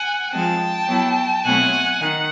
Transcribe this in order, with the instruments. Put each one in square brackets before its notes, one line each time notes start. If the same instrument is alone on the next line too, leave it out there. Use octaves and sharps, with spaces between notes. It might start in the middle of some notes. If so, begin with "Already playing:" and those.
Already playing: [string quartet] F#5 G#5
F3 G#3 C4 G5 A5
F#3 B3 E4
B2 F#3 A3 C4 E4 F#5 G#5
D#3 F#5